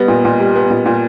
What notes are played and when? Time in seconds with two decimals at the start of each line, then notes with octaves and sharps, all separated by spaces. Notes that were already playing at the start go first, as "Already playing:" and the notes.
Already playing: G3 B3 D#5
0.08 A#2
0.25 A#2
0.40 G3
0.56 B3
0.71 A#2
0.86 A#2